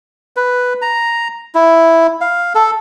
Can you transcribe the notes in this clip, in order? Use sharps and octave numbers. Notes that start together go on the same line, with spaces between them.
B4
A#5
E4
F5
A4